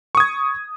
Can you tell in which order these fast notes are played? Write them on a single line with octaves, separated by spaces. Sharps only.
C#6 D#6 G#6